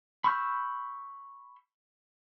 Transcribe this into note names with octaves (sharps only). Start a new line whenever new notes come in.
B5 C#6 E6 F6 G6